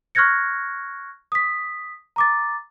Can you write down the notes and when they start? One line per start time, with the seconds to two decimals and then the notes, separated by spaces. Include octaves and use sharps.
0.15 C#6 F6 F#6 G#6 A#6 C#7
1.32 D#6 B6
2.16 A#5 D6 A6